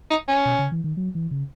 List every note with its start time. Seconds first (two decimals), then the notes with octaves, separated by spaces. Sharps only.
0.11 D#4
0.28 C#4
0.45 B2
0.59 C#3
0.72 E3
0.84 D#3
0.97 F#3
1.15 E3
1.31 C#3